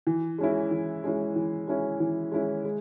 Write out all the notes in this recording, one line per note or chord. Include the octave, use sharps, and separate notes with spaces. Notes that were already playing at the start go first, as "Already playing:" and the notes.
E3
G#3 C#4 E4
E3
G#3 C#4 E4
E3
G#3 C#4 E4
E3
G#3 C#4 E4
G#3